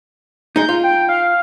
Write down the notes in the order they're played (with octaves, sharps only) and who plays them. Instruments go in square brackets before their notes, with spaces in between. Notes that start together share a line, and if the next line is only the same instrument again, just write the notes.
[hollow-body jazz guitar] G#3 D#4 [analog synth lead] G6
[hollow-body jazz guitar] F4
[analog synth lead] G5
F5